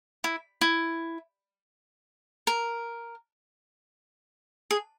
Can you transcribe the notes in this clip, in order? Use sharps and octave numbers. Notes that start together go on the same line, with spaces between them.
E4
E4
A#4
G#4